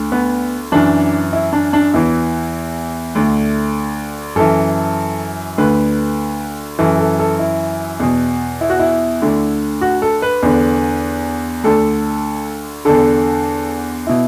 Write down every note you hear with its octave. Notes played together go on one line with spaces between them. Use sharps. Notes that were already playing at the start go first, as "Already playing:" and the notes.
Already playing: D2 D3
B3
F#2 E3 D4
E4
D4
D4
E2 E3 E4
D2 D3
F#2 E3 A4
D2 D3 B4
F#2 E3 A4
A4
A4
E4
E2 B2
E4
F#4
E4
D2 D3
F#4
A4
B4
E2 D3
D2 D3 A4
E2 D3 A4
B2 E4